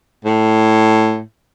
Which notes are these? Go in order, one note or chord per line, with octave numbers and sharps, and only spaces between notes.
A2